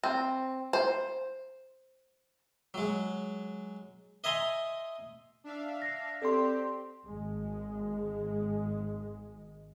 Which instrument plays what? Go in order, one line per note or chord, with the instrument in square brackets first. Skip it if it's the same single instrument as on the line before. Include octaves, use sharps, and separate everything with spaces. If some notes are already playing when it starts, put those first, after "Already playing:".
[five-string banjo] C4
C5
[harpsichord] F#3 G#3
D#5 E5 G#5 A#5 C6
[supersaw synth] D4 E5 F5
[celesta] A#6 C7
[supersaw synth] C4 G4 [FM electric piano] A4 C6 [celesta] D5
[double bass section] G#1 G#3